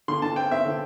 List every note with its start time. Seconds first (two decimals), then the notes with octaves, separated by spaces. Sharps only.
0.08 D3 C6
0.22 D3 A5
0.36 C4 G5
0.51 C4 E5
0.65 D3